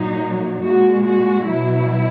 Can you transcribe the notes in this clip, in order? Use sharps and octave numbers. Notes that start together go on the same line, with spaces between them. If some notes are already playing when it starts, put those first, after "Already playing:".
Already playing: A#2 F#3 D#4
A#2 G#3 F#4
F#4
B2 F#3 E4